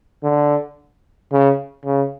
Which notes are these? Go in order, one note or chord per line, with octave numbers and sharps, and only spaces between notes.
D3
C#3
C#3